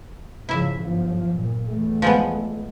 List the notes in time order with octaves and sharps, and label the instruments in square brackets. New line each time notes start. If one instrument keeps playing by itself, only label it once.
[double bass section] G#2 C#3 F3 [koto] E4 E5
[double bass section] G1 F3 F#3
A#2
E2 A3
[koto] F3 G#3 B3